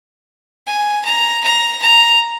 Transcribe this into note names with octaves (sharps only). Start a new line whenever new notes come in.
G#5
A#5
A#5
A#5